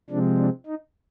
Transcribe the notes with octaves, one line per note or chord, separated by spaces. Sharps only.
C3 F3 G#3 C4 D4
D4
D#4